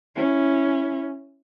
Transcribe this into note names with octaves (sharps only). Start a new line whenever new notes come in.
C#4 E4